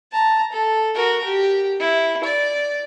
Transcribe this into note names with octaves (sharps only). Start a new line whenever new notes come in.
A5 A#5
A4
F#4 A#4
G4
E4
D5